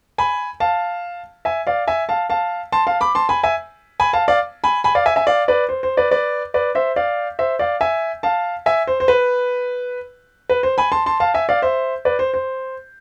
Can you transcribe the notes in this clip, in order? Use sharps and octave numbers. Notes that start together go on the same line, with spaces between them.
G#5 B5
F5 A5
E5 G#5
D5 F5
E5 G#5
F5 A5
F5 A5
A5 C6
F5 A5
B5 D6
A5 C6
G#5 B5
E5 G#5
G#5 B5
F5 A5
D5 F5
G#5 B5
G#5 B5
D5 F5
E5 G#5
E5 G#5
D5 F5
B4 D5
C5
C5
B4 D5
B4 D5
B4 D5
C5 E5
D5 F5
C5 E5
D5 F5
E5 G#5
F5 A5
E5 G#5
C5
C5
B4
B4
C5
G#5 B5
A5 C6
A5 C6
F5 A5
E5 G#5
D5 F5
C5 E5
B4 D5
C5
C5